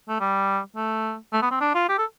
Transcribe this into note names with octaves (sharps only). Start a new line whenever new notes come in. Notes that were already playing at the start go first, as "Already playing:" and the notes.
A3
G3
A3
A3
B3
C4
D4
F4
G4
A4